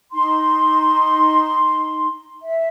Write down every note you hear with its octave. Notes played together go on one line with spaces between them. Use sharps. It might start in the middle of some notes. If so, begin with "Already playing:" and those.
D#4 C6
E5